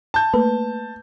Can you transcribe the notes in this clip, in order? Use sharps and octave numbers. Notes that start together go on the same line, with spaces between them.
A5 G6
A3 A#3 B4